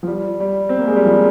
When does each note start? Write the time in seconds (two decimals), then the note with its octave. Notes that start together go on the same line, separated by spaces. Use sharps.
0.03 F3
0.07 G3
0.40 G3
0.69 C4
0.79 A#3
0.87 G#3
0.96 G3
1.05 F3